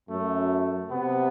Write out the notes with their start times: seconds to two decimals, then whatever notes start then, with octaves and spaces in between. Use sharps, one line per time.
0.09 F#2 A3
0.90 C3 B3